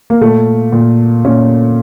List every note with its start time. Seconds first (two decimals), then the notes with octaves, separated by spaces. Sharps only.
0.10 A#3
0.21 A#2 A3
0.72 A#2
1.25 A#2 C#4